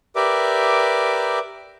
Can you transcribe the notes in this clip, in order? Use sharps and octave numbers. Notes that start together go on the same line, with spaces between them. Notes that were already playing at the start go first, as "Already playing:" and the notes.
G4 A#4 B4 D5 E5 D6